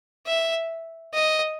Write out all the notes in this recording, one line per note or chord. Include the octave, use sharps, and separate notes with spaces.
E5
D#5